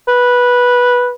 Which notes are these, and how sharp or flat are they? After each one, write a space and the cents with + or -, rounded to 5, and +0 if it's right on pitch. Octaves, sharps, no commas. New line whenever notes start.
B4 -10